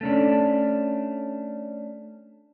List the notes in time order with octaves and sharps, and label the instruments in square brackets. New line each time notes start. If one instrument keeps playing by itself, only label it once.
[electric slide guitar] A3 C#4 D4